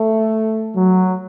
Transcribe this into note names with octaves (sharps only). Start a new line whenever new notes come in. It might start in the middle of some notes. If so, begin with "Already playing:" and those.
Already playing: A3
F#3